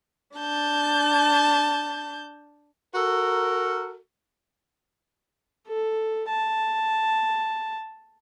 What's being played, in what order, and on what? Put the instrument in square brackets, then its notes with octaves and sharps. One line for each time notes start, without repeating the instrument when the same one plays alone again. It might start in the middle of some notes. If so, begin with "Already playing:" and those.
[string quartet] D4 A5 G6
[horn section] F#4 A4 A#4
[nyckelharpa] A4
A5